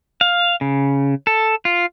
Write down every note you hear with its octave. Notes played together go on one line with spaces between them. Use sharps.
F5
C#3
A4
F4